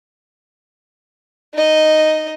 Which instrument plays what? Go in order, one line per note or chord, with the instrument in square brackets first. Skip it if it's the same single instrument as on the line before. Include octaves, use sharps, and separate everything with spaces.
[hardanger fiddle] D#4 D#5